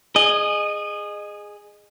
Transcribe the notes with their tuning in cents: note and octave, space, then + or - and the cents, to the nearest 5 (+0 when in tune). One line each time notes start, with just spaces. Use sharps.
G#4 +0 D#5 -25